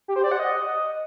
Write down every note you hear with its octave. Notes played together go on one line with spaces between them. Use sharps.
G4
C5
D5
F#5
D#5